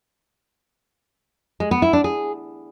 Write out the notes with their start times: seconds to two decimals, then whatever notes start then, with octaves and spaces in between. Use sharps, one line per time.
1.60 G#3
1.71 B3
1.82 E4
1.93 D4
2.04 G#4